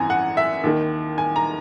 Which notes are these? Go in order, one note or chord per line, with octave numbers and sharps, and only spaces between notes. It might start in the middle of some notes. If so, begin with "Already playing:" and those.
Already playing: G#1 F#2 E3 G#5 A#5
F#5
E5
D#2 D#3
G#5
A#5